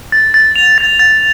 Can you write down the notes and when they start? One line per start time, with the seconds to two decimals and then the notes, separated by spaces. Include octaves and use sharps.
0.12 A6
0.34 A6
0.56 F7
0.78 A6
0.99 A6